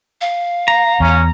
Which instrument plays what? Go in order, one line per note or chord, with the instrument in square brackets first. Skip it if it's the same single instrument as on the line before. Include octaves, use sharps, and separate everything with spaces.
[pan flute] F5
[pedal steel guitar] A#5
[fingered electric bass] E2 [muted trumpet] C#4